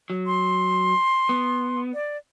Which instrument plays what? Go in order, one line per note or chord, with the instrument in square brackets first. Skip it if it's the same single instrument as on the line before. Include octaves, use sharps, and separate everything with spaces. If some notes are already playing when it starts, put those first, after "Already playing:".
[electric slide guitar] F#3
[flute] C6
[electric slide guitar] B3
[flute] D5